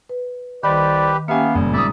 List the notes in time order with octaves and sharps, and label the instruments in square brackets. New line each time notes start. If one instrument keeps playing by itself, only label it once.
[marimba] B4
[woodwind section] C2 C5 D5 [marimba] D#3 [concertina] G4 B4 [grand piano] B5
[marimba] A#3 C#4 [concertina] B3 [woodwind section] G4 F5 [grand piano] E5 G#5
[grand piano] F#1 [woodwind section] A#2 G3
[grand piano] G#2 D#6 [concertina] D5 E5